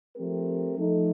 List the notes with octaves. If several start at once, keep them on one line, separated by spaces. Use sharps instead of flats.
F3 A3 C4 G4 A#4
F3 A3 D#4 A4